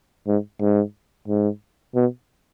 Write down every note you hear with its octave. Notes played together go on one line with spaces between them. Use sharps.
G#2
G#2
G#2
B2